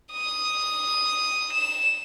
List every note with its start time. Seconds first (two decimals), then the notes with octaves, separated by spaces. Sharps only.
0.13 D#6
1.53 E7